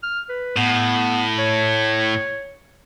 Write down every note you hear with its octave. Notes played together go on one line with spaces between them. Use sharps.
F6
B4
A2 B3
C#5